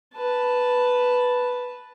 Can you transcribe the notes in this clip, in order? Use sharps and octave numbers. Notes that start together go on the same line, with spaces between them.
B4 A5